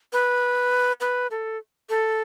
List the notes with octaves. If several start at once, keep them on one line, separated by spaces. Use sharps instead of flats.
B4
B4
A4
A4